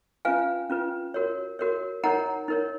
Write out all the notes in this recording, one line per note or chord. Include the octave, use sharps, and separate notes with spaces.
C#4 F4 B4 F5 G#5
C#4 F4 B4
F#4 A#4 C#5
F#4 A#4 C#5
D#4 A#4 C#5 F#5 A#5
D#4 A#4 C#5